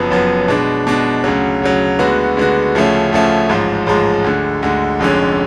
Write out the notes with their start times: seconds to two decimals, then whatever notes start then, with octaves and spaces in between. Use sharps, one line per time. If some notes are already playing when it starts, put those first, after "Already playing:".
Already playing: F#1 F#2 F3 B3
0.11 F#1 F#2 F3 B3
0.48 B2 G#3 D4
0.87 B2 G#3 D4
1.24 D2 C#3 F#3
1.62 D2 C#3 F#3
1.99 D2 D3 G#3 B3 F#4
2.37 D2 D3 G#3 B3 F#4
2.75 D2 C#3 F3 A3 C#4
3.12 D2 C#3 F3 A3 C#4
3.49 A1 G#2 F3 G#3
3.86 A1 G#2 F3 G#3
4.24 D2 D3 G#3
4.62 D2 D3 G#3
4.99 F1 F2 D3 G#3 C#4